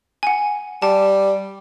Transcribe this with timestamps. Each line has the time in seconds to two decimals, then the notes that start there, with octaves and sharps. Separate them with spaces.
0.23 F#5 G#5
0.82 G3 A5